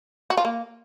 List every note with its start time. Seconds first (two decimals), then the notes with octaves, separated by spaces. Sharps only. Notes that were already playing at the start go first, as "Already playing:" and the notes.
0.30 F#4
0.37 F4
0.45 A#3